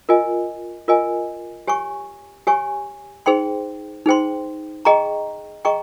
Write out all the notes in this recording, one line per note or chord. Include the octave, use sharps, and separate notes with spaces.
F4 A#4 D#5 G#5
F4 A#4 D#5 G#5
G4 C#5 G#5 C#6
G4 C#5 G#5 C#6
D#4 G#4 C5 G5 C6
D#4 G#4 C5 G5 C6
G#4 D#5 G5 A#5 C#6
G#4 D#5 G5 A#5 C#6